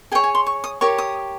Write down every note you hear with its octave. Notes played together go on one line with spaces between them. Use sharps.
G#4 C#5 G5
G#5
C6
C#6
D#6
G4 A#4 C#5 C#6
D#6